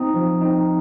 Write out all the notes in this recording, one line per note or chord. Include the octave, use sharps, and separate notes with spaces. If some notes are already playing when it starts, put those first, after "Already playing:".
Already playing: C4 D#4 A#5 D#6
F3
C4 D#4